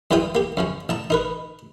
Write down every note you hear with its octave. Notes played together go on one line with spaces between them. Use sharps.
F#2 E3 G3 F4 G5 D#6
A#3 G4
F#2 F3 C#4
A1 A5 A#5
D#4 A#4 B4